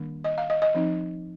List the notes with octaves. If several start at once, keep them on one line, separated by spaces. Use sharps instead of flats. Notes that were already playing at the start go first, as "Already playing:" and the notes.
Already playing: D#3 G3 A#3 D4
D#5
F5
D#5
D#5
F3 C4 D#4